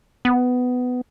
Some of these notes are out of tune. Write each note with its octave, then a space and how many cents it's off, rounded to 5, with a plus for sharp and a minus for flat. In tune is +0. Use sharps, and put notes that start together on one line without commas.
B3 +15